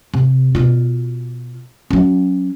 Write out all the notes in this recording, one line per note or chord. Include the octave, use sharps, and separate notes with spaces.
C3
B2 F4
F#3 C#4